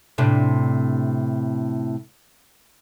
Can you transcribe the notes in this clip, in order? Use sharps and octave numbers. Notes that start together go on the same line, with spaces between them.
A2 C3 D4